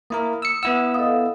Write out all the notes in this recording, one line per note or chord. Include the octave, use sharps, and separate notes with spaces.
A#3 E4 A#4 D#6
E6 C#7
B3 E4 F#5 E6
A4 D#5 F5 D#6